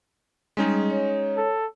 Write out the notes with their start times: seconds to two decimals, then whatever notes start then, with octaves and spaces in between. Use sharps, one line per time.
0.57 G3 G#3 C#4 D#4 G#4
0.90 C#5
1.37 A4